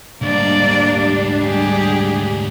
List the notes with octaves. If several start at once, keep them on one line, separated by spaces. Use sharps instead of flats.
D2 G#2 G3 A#3 D4 D5
G4 G#4